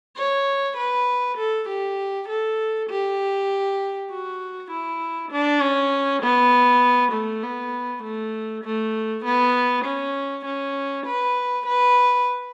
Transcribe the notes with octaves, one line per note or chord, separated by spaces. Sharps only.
C#5
B4
A4
G4
A4
G4
F#4
E4
D4
C#4
B3
A3
B3
A3
A3
B3
C#4
C#4
B4
B4